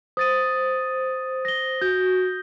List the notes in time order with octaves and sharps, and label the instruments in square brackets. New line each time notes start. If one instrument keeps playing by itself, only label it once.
[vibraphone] C5 [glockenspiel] D#6 A6 D#7
[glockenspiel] A#6 G7
[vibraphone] F#4 [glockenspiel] G6